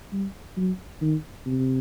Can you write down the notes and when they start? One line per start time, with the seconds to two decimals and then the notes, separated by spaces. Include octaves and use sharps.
0.12 G3
0.57 F#3
1.02 D#3
1.46 C3